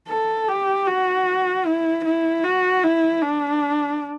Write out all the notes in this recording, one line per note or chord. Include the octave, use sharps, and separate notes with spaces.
A4
G4
F#4
E4
E4
F#4
E4
D4